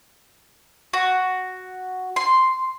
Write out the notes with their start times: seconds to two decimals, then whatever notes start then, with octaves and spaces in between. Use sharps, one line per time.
0.93 F#4
2.16 C6